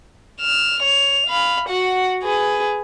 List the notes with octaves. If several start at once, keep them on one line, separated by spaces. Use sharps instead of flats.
F6 E7
C#5 F7
F5 B5
F#4 F#5
G#4 B4